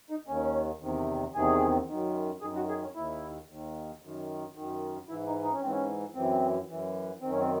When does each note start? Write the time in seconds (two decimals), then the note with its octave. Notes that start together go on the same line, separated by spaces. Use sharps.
0.10 D#4
0.28 D#2 D#3 C#4
0.82 E2 C3 D#3
1.35 E2 C3 D#3 G#4
1.88 F#2 D#3
2.41 F#2 D#3 G#4
2.56 F#4
2.69 G#4
2.81 C#4
2.95 D#2 D#3 E4
3.49 D#2 D#3
4.02 F#2 D#3
4.55 F#2 D#3
5.09 G#2 E3 E4
5.27 D#4
5.44 D#4
5.52 C#4
5.62 G#2 E3 C4
5.70 C#4
6.15 F#2 E3 C4
6.69 F#2 E3
7.22 F#2 D#3 C4
7.32 C#4
7.40 C4